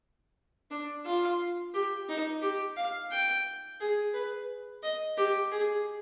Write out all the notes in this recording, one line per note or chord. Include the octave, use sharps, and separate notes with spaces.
D4
F4
G4
D#4
G4
F5
G5
G#4
B4
D#5
G4
G#4